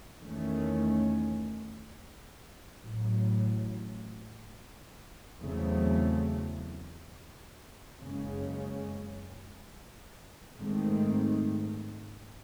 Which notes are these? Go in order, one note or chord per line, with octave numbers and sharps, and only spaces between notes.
E2 D#3 A3 C#4
A1 A2 F#3
E2 C#3 F#3 A3 C4
F#1 F#2 C#3 G#3 C#4
G#2 D#3 A3 C4